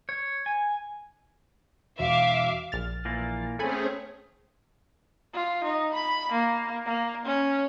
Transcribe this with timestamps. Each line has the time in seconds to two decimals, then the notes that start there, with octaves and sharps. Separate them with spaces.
0.09 C#5
0.46 G#5
1.99 E1 E5 F5 D6
2.72 A#1 F6 A6
3.05 A#2 E3 A#3
3.59 A3 C4 C#4 G#4 A4 G#5 B5
5.34 F4
5.64 D#4
5.94 B5
6.32 A#3
6.86 A#3
7.26 C#4